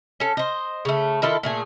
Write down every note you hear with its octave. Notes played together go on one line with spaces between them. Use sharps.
C#4 A4
C5 D#5
C#3 A3
D#3 E4 F4 A4
A#2 A3 G#4